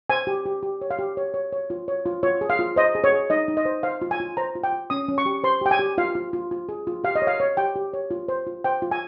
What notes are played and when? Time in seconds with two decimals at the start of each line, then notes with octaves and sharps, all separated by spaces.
0.10 C5 G#5
0.27 G4
0.46 G4
0.63 G4
0.81 C#5
0.91 F5
0.99 G4
1.17 C#5
1.34 C#5
1.52 C#5
1.70 F4
1.88 C#5
2.06 F4
2.23 F4 C#5
2.41 G#4
2.50 F5
2.59 F4
2.76 C5 D#5
2.95 G#4
3.04 C#5
3.13 G#4
3.30 D#4 D#5
3.48 D#4
3.57 D#5
3.65 C5
3.83 C5 F5
4.02 F4
4.11 G#5
4.20 F4
4.37 C5 A#5
4.55 F4
4.64 G5
4.73 F4
4.90 C#4 D#6
5.08 C#4
5.18 C#6
5.26 G4
5.44 C5 C6
5.61 G4 G5
5.71 G#5
5.79 G4
5.98 F4 F5
6.15 F4
6.33 F4
6.51 F4
6.69 G#4
6.87 F4
7.04 G4 F5
7.15 D#5
7.22 C#5
7.27 F5
7.40 C#5
7.57 G4 G5
7.76 G4
7.93 C#5
8.11 F4
8.28 C5
8.47 F4
8.64 C5 G5
8.82 F4
8.91 G#5